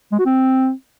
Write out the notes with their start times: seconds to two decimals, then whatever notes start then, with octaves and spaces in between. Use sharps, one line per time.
0.12 G#3
0.19 F#4
0.26 C4